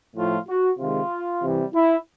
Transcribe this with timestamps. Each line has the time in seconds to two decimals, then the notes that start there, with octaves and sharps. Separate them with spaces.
0.16 A2 F3 A3 F4
0.48 F#4
0.79 C3 D#3 G#3 F4
1.42 C3 E3 G3
1.74 E4